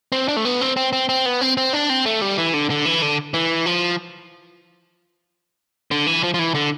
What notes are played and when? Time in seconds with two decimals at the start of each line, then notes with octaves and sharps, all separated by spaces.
0.12 C4
0.28 D4
0.36 A3
0.45 B3
0.61 C4
0.77 C4
0.93 C4
1.09 C4
1.26 B3
1.41 C4
1.57 C4
1.73 D4
1.90 C4
2.06 A3
2.22 G3
2.38 E3
2.54 D3
2.70 D3
2.86 E3
3.02 D3
3.34 E3
3.66 F3
5.91 D3
6.07 E3
6.23 F3
6.34 F3
6.39 E3
6.55 D3